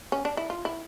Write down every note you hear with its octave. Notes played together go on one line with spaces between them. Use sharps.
C#4
D4
E4
F4
E4